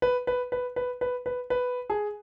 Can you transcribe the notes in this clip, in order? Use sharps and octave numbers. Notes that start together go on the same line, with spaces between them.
B4
B4
B4
B4
B4
B4
B4
G#4